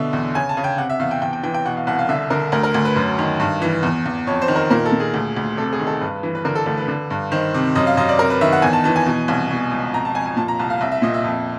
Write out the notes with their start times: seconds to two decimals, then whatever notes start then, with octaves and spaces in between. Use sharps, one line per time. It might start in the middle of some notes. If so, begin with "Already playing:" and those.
Already playing: B2 D3 E5
0.13 E2
0.35 C#3 G#5
0.49 A5
0.57 C#3
0.64 G5
0.78 C3 F#5
0.90 E5
0.99 E2 F5
1.11 G5
1.22 E2 G5
1.33 G5
1.43 E3 G5
1.54 G5
1.65 B2 F#5
1.77 F5
1.87 C2 F#5
1.99 F5
2.09 D3 E5
2.30 D3 A#4
2.52 D2 A#4
2.63 A#4
2.74 D2
2.85 B4
2.96 F#2
3.19 D#3
3.40 G2
3.62 E3
3.83 E2
4.06 E2
4.27 F2 C#5
4.42 C5
4.48 D#3
4.56 A#4
4.70 A#2 A#4
4.85 A4
4.92 A#2
5.00 G#4
5.14 D2
5.36 D2
5.57 C3 A4
5.73 G#4
5.79 D#3
5.87 A4
6.01 G2 B4
6.23 E3
6.35 B4
6.45 D3 A#4
6.55 A4
6.66 D2 A4
6.77 B4
6.88 D3
7.10 G2
7.32 D#3 C5
7.54 C3
7.75 F#2 D#5
7.87 F5
7.97 F#2 D#5
8.09 D5
8.19 C3 A#4
8.30 B4
8.41 D#3 E5
8.52 F#5
8.62 E2 G#5
8.73 A5
8.84 E3 A5
8.96 G#5
9.06 B2
9.28 C2
9.51 B2
9.71 C#2
9.93 F2 A#5
10.05 A5
10.15 F2 G#5
10.26 G#5
10.37 A#2 A5
10.48 A#5
10.59 C2 A5
10.70 F5
10.81 C2 E5
10.92 E5
11.02 A#2 D#5
11.14 E5
11.24 F2